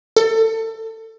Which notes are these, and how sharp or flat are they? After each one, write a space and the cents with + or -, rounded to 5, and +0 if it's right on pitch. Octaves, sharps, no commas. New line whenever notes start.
A4 +25